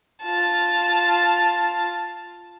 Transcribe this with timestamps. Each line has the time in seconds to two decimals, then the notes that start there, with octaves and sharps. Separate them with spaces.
0.23 F4 A5